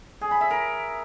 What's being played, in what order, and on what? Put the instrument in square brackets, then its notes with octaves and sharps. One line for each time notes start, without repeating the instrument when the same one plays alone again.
[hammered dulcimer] G#4
B5
E5
A#4